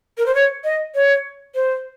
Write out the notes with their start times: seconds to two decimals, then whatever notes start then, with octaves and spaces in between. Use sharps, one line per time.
0.18 A#4
0.26 C5
0.35 C#5
0.64 D#5
0.95 C#5
1.55 C5